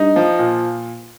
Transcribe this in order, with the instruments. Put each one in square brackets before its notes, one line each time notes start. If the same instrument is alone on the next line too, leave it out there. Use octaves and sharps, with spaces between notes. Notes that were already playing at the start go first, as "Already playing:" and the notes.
Already playing: [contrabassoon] G2 [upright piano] D#4
[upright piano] F3
A#2